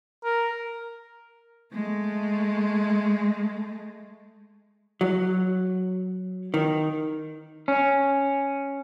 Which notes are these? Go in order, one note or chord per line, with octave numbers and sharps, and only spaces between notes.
A#4
G#3 A3
F#3
D#3
C#4